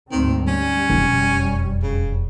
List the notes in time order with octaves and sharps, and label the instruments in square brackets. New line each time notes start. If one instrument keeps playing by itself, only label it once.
[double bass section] D2 G#2 C4 [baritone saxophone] D#3
[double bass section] G3 [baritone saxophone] C#4
[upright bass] E1 F2
[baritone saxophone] C#3